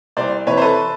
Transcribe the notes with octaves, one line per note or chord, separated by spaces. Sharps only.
C2 C5 D5
C3 E3 B4 C#5
C5
A4 B4